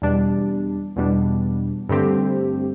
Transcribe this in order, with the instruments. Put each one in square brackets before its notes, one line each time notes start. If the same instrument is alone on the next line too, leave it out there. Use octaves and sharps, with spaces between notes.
[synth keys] E2 B2 G3 D4
E2 B2 G3 D4
G2 D3 A3 C4 G4